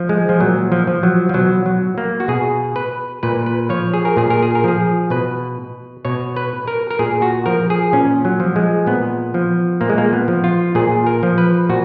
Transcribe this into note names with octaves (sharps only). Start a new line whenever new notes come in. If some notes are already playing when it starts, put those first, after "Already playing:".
Already playing: F3
G#3
F3
A#2 F#3
F3
F3
F#3
F3
B2 F#3
F#3
A#3
F#4
B2 G#4
B4
A#2 B4
B4
F3 C#5
G#4
A#4
A#2 G#4
A#4
G#4
A#4
F3 G#4
B2 B4
B2 C#5
B4
A#4
A#4
A#2 G#4
F#4
F3 A#4
G#4
A#2 C#4
F#3
F3
G#3
A#2 B3
F3
A#2 A#3
G#3
A#3
B3
F3
F4
A#2 G#4
A#4
F3
B4
A#2 F#4